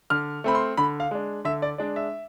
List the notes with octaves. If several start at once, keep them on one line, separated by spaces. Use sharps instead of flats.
D3 F6
A3 C4 B5
C6
D3 B5
F5
G#3 D4
D3 E5
D5
G#3 D4 D5
E5